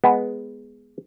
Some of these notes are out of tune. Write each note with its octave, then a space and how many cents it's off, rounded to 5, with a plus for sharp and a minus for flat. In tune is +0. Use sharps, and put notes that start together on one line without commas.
G#3 +0 B3 +0